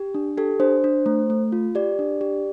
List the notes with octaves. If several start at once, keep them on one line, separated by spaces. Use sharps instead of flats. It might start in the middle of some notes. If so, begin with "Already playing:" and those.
Already playing: G4
D4
G4 A4
D4 C5
D4
A3
A3
F4
G4 D5
D4
G4